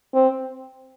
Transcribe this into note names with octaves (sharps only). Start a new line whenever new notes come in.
C4